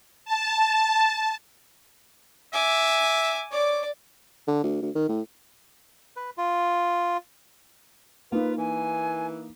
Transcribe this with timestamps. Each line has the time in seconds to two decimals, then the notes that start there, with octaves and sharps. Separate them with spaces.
0.25 A5
2.53 E5 G#5 D6
3.51 C#5 D5 D6
4.47 D3
4.63 D2
4.82 D2
4.95 D#3
5.09 A2
6.16 B4
6.37 F4
8.32 A#3 D#4 F4 B4
8.58 E3 G#5